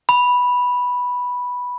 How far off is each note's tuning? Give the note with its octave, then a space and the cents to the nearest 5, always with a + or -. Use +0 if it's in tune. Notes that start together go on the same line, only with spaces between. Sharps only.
B5 -5